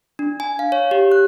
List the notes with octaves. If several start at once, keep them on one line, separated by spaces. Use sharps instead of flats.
D4
G#5
F5
C#5
G4
F#6